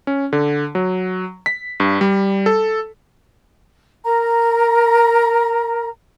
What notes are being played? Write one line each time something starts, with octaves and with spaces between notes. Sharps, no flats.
C#4
D3
F#3
B6
G2
G3
A4
A#4 A#5